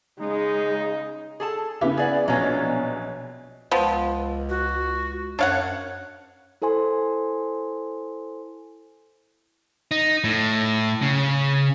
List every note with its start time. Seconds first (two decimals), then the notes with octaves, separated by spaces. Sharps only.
0.19 C#3 G#3 D#4
1.40 G#4 A4 A5
1.81 C#3 B3 E4 G4
1.97 G#4 D5 F#5
2.28 A#1 B2 F#3 C#4 F4
3.71 C#2 F3 B3
4.49 F#4
5.39 F#2 D4 C#5 F5 F#5
6.62 E4 A4 C5 G#5 C6
9.91 D#4
10.24 A2
11.02 C#3